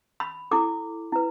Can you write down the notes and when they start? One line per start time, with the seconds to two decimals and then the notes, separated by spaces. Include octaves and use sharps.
0.20 B5
0.51 E4 A4 D6
1.12 E4 B4